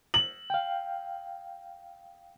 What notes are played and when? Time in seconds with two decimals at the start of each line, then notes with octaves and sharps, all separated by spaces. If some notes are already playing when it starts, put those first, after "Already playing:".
0.14 F#7
0.50 F5 G5